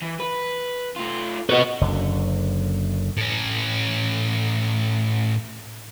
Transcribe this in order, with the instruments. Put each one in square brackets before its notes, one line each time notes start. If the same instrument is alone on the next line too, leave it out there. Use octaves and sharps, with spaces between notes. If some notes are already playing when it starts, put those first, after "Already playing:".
[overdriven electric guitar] E3
B4
A3 F4
[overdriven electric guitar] F#4 [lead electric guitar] B4 D#5
[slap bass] F#1 F#2 D3
[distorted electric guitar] A2 C#4